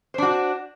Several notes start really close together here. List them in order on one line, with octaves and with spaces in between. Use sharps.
C5 D4 F#4